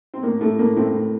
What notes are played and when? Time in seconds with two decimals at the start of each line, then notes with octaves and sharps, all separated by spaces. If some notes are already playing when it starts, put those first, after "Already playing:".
0.14 C4
0.23 A2 A#3
0.41 A2 A3
0.59 A2 A#3
0.77 A2 A3 C4
0.94 A2